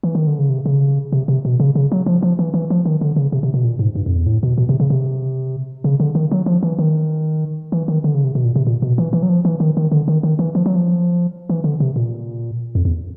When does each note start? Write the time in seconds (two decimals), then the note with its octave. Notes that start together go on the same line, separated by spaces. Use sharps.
0.03 E3
0.15 D#3
0.27 D3
0.39 C#3
0.50 C3
0.66 C#3
1.12 C3
1.28 C3
1.45 B2
1.60 C#3
1.75 C#3
1.92 F#3
2.06 F3
2.22 F3
2.39 E3
2.54 E3
2.70 F3
2.85 D#3
3.01 D3
3.16 C#3
3.32 C3
3.43 C3
3.54 B2
3.64 A#2
3.79 G#2
3.95 G2
4.06 F2
4.16 E2
4.27 A2
4.43 B2
4.58 B2
4.69 C3
4.80 C#3
4.90 C3
5.84 C#3
6.00 D3
6.15 D#3
6.31 F#3
6.46 F3
6.63 E3
6.79 D#3
7.72 E3
7.88 D#3
8.04 D3
8.14 C#3
8.24 C3
8.35 B2
8.45 A#2
8.56 C3
8.67 A#2
8.82 B2
8.98 E3
9.13 E3
9.23 F#3
9.29 F3
9.45 E3
9.60 D#3
9.77 D#3
9.92 D3
10.08 D#3
10.23 D#3
10.39 E3
10.55 F3
10.66 F#3
10.75 F3
11.49 E3
11.64 D3
11.80 C3
11.96 A#2
12.75 F2
12.85 E2